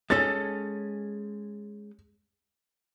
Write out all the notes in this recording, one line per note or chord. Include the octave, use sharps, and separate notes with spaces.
G#3 C#4 A4 A6